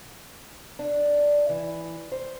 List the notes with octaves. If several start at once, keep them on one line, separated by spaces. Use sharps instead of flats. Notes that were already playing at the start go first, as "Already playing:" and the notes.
D4
E3
C5